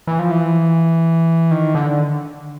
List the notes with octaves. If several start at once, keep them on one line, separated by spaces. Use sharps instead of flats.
E3
F3
E3
D#3
D3